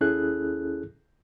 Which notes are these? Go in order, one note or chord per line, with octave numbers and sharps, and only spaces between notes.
D#2 C#4 E4 G#4 A4 F#6